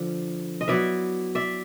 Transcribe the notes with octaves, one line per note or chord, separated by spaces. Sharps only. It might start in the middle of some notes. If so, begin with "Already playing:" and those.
Already playing: D3 F3
D#5
F#3 B3 E4 D5 E5
D5 E5